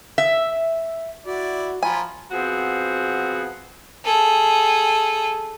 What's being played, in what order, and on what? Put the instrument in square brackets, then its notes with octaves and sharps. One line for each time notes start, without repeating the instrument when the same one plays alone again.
[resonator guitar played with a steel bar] E5
[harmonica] E4 D5 [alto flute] F#4
[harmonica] F3 F4 B5 [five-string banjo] G#5 [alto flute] A#5
[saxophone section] F3 B3 C4 F#4 G#4
[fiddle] G#4 A4